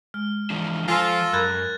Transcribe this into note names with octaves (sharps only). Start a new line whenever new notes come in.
G#3 F6
E3 F3 D4
F3 F4 A4 C5 F5 G#5 A#6
F#2 A#4 B5 F#6 G#6 A6